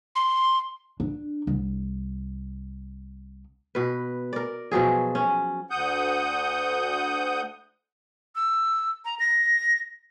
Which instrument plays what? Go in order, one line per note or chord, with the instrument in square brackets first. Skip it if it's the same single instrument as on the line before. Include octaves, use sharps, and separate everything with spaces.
[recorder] C6
[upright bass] D4
C2
[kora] B2 B4
A#4 D5
B2 F3 F#3 G#4
C#4
[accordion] D2 F#5 D#6 G6
[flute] E6
A#5
A#6